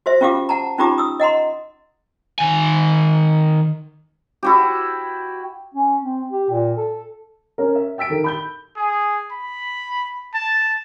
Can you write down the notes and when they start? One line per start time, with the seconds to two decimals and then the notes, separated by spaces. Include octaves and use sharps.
0.06 F#4 C5 E5
0.21 C#4 F4 G4 F5 D6
0.49 F#5 A5 A#5
0.78 C#4 D#4 F4 G4 A#5 D6
0.98 D#6 E6
1.20 D#5 F#5 A#5 C6
2.39 D#3 G#5
4.43 E4 F#4 G4
5.74 C#4
6.02 C4
6.32 G4
6.50 A#2
6.77 A4
7.58 C#4 A#4
7.75 E5
7.98 G5 E6 B6 D7
8.10 D#3 A4 A#4
8.24 B5 G6 G7
8.77 G#4
9.32 B5
10.34 A5